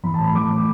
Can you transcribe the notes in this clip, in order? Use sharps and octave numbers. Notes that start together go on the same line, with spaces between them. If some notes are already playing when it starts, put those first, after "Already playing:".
E3 B5
A5
A2 B5
E3 D6
A2